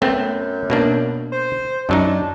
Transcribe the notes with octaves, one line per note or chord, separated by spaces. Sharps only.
F#2 A3 B3 C4
B2 A#3 D4
C5
F#2 F#3 D4 D#4